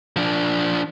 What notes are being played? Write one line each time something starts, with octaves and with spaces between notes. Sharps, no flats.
F3 D4